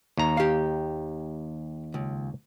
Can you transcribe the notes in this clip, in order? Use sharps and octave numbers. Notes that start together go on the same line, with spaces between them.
D#2 A#5
G4 F5
C#2